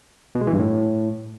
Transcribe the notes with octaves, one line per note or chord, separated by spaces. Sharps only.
B2
G#3
E3
G2
A2